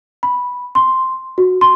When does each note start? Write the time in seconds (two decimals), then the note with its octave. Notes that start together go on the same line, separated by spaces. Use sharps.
0.23 B5
0.75 C6
1.38 F#4
1.61 C6